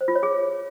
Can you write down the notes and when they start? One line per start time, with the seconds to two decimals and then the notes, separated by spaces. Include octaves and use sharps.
0.01 C5
0.08 F4
0.15 C#5
0.23 G#4